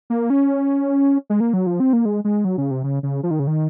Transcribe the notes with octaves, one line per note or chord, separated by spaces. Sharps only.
A#3
C#4
G#3
A#3
F#3
F3
C4
A#3
G#3
G#3
F#3
C#3
C3
C#3
C#3
F3
D#3
C#3
D#3